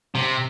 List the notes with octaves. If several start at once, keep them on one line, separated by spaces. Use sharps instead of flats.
C3